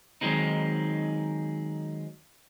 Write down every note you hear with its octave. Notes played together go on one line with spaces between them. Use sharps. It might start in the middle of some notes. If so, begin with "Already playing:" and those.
D#3 F#3 G#3 C4 D#4